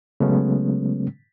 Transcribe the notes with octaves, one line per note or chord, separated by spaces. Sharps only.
C#3 F#3 G#3 A3 B3 C#4